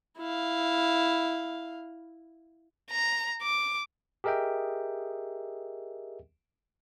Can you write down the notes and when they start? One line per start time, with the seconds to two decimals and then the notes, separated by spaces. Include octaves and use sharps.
0.18 E4 F5
2.91 A#5
3.43 D6
4.24 G4 G#4 A#4 D#5 E5 G5